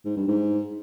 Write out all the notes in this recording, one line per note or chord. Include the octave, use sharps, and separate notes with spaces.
G#2
G2
G#2